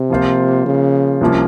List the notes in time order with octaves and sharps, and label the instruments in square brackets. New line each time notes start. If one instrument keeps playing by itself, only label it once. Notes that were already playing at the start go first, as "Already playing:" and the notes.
Already playing: [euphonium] C3
[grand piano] F3 A#3 F4 C5
[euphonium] C#3
[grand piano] C2 C3 F3 A#3 C#4